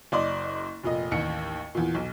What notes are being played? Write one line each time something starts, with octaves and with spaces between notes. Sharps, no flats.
F#1 D5 D#5 C6
F1 A#2 D#5
A1 D#2 C#7
E2 A#2
B1